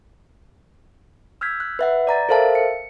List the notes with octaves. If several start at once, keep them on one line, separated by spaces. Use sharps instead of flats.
E6 F6 G6 G#6 B6
F#6
B4 E5 F#5
D5 A#5 A6
A4 A#4 C5 E5 F5 A5
C#7